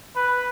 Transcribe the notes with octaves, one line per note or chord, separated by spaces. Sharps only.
B4